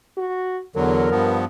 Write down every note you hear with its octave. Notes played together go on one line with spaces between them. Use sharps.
F#4
E2 D3 F#3 A#4
G2 F3 B3